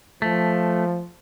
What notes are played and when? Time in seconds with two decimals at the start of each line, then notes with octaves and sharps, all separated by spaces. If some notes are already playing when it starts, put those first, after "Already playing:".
0.22 F3 A3